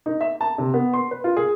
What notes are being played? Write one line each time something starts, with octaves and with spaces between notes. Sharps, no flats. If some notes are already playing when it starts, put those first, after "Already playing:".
D#4
E5
A5
C3
B3
C6
B4
F4
G#4